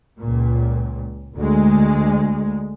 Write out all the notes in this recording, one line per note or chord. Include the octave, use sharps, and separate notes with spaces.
C#2 A#2
D2 G#3